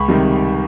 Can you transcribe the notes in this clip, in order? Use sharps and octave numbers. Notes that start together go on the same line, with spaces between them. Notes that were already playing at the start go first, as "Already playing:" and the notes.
Already playing: C#2 B5 C#6
C3 D#3 G3